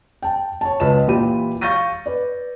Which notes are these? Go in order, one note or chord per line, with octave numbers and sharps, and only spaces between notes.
G5 A5
C#5 A5
C#2 B4 D#5 A5 E7
A#2 E3 F4 G4 B5 D#7
F5 C#6 G6 A6 A#6 D#7
B4 D5